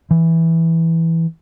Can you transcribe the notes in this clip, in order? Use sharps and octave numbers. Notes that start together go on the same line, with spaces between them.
E3